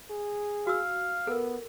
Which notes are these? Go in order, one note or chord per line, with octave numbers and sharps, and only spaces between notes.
G#4
F#4 F5 E6
B3 A4 A#4